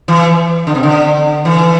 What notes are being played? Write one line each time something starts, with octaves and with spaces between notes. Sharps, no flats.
E3
D3
C3
D3
E3